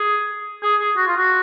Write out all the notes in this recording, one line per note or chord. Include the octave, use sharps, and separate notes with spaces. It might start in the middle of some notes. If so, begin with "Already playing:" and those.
Already playing: G#4
G#4
G#4
F#4
F4
F#4